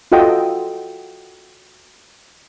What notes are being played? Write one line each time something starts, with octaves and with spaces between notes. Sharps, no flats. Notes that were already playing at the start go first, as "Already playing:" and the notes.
F4 F#4 A4 D#5 G5